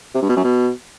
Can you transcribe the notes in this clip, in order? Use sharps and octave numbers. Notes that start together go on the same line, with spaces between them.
C3
G2
B2
F#2
B2